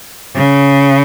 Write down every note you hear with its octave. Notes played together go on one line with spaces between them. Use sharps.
C#3